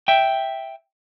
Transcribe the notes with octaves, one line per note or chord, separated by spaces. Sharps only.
E5 G5